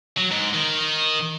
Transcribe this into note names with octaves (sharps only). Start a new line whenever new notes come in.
F#3
G#2
D#3